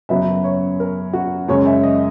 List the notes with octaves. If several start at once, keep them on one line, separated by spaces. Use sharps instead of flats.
F#2 C#3 F#3 B3 E5
C#5
A#4
F#4
F#2 C#3 G#3 C#5
E5
D#5